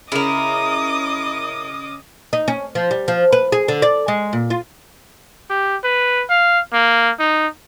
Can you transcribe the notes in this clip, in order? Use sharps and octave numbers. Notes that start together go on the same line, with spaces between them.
C#3 E4 A#4 D#5 D6 D#6
D#4
C#4
F3
G3
F3
B4
G#4
D3
D5
G#3
A#2
F4
G4
B4
F5
A#3
D#4